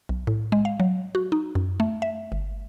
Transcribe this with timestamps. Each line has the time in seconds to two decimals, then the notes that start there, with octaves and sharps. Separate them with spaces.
0.09 B1
0.27 A2
0.52 G#3
0.65 F5
0.80 F#3
1.15 F#4
1.32 D#4
1.55 F#2
1.80 A3
2.02 E5
2.32 G1